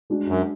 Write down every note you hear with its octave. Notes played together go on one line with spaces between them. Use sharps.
G#3 D4 F#4
F#2